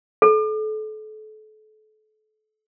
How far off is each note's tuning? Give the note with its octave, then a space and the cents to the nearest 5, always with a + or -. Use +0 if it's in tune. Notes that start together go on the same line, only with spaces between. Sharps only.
A4 -35